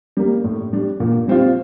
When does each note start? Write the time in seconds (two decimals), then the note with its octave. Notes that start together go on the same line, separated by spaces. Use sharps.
0.17 G3 A#3
0.44 A2
0.73 G3 D4
1.00 A#2
1.28 G3 C4 F4